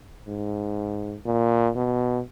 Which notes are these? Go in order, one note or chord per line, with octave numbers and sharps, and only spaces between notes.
G#2
A#2
B2